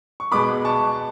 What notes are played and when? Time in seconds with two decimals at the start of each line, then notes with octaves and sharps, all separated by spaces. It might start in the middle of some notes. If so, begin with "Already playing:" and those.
0.20 C#6
0.32 B2 G#3 B3 B5 D6
0.65 A5 C#6